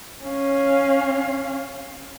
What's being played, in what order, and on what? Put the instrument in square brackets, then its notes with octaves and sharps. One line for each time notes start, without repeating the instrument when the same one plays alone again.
[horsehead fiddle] C#4 F5